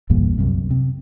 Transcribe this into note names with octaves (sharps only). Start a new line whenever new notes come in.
A#1 E2 G2 A#2
C2 F#2 C3
C3